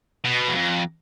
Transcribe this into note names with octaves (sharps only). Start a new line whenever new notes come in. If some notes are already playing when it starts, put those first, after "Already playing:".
B2
E2
F2